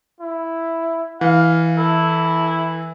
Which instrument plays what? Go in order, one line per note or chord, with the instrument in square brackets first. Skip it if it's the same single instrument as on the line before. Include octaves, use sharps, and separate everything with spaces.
[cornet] E4
[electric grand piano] E3 [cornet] F5
[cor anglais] E4 [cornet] A4